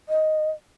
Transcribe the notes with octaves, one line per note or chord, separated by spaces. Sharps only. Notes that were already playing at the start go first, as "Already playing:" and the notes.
D#5